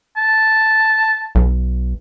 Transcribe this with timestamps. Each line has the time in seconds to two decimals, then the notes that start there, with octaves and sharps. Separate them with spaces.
0.17 A5
1.35 B1